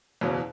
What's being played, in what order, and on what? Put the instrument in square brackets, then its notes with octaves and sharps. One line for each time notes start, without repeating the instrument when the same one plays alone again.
[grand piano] F#1 E2 B2 C#4